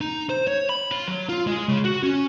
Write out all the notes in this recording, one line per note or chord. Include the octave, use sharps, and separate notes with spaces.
D#4
C5
C#5
B5
F4
F#3
F4
G#3
C#3
F#4
C#4